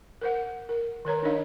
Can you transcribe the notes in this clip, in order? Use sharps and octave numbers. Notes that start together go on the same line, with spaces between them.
A#4 C5 F#5
A#4
D#3 A#4 C#5 A#5
D4 D#4 A#4 D#5 F5